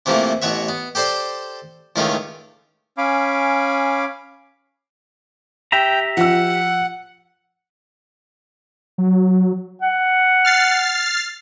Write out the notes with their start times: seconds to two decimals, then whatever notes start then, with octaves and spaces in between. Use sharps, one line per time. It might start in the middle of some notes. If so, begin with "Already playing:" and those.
0.06 C3 E3 F3 A3 A#3
0.42 A1 B2 F#4 C#5 E5
0.69 B3
0.95 G4 A4 C5 D5 C6
1.96 C#2 A2 D#3 C#4 F4
2.98 C#4 F5 G#5 B5 D6
5.72 G4 E5 G5 A#5
6.17 F3 F#5 E6
8.98 F#3
9.82 F#5
10.45 F6 A6 C7